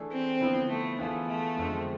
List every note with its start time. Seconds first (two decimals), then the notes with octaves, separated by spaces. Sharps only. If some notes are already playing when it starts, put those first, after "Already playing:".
Already playing: E3 A3 D4 G#4
0.11 C4
0.41 D3 F3 B3 E4
0.70 A3
0.99 E3 A3 B3 F4 G#4
1.28 A3
1.56 F2 D3 G#3